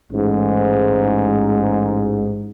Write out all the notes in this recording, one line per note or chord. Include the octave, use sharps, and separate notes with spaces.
A1 G#2